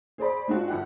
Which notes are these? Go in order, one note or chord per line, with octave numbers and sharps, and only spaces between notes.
G#4 C5 D5 B5
G#3 D4 F4 F#4
G1 F#5